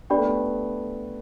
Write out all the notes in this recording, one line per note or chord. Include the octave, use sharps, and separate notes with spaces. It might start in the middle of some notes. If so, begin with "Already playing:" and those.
B3 D4 G4 D5 G5 B5
A3
B3